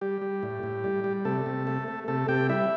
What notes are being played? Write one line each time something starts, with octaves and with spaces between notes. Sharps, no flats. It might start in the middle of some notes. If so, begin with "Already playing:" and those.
G3 G4
G3
A2
A2
G3
G3
C3 A3 A4
C3
A3
A3
C3 A3 A4
C3 G4 G5
G3 E4 E5